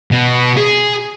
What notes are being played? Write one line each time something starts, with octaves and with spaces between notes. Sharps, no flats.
B2
G#4